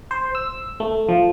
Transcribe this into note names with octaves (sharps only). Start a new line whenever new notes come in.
C5
E6
A3
F3